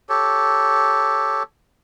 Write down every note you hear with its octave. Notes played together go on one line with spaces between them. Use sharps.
G4 A4 C#5